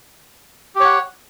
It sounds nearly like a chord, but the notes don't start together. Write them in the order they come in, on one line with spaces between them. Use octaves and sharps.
G4 C#5 F#5